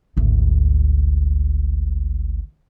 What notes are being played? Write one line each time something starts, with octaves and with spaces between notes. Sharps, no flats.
G#1 D2